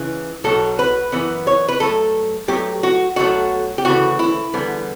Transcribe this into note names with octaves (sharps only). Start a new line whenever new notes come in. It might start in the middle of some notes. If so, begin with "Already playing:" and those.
Already playing: C#2 C#3 E3
B1 B2 F#3 A4
B4
F#2 E3 B3
C#5
B4
G2 F#3 A3 A4
G2 F#3 A3 G4
F#4
B1 B2 F#3 A3 F#4
G4
D2 C#3 E3 A3 F#4
E4
E2 D3 G3 B3